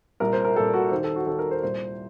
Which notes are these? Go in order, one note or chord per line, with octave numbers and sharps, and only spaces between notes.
C2 A#2 A#4
C5
A#4
C2 A#2 A4
F#4
D#2 D#3 C5
A4
F#4
D#2 D#3 A4
A#4
C5
C2 A#2 C5